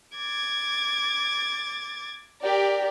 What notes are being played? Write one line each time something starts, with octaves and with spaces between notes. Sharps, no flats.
D6 G#6 A6
G4 A#4 D5